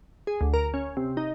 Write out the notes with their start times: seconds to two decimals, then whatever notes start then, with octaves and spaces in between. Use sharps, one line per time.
0.27 G#4
0.41 D2
0.54 A#4
0.74 C#4
0.97 C3
1.17 D#4